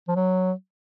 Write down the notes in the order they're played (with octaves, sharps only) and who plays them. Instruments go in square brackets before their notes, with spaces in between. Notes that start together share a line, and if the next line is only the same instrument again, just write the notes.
[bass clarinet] F3
F#3